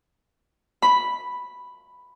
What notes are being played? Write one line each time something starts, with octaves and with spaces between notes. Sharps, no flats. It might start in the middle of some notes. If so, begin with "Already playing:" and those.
B5